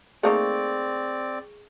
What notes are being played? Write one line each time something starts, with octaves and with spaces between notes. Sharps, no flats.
A3 A#3 C4 D#4 G#4 D5 C#6